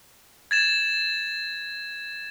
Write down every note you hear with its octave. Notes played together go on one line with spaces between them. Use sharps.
G#6 A6 E7